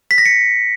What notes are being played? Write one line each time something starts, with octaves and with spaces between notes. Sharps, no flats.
B6
A#6
C#7